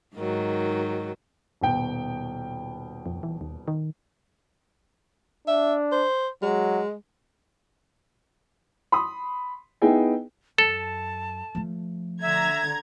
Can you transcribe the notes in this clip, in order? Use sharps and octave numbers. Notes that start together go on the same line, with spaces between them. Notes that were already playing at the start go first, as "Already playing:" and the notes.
G#2 D#3 F#3
D#1 B2 G5
F2
E3
D#2
D#3
D4 E5
C5
F#3 G#3
B5 C6 D#6
B3 D#4 E4 G#4 G5 G#5
F#2 A4 A5
F3 A3
D3 E5 A#5 G#6